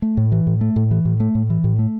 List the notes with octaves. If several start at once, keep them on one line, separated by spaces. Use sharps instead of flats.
A3
A2
E3
A2
A3
A2
E3
A2
A3
A2
E3
A2
A3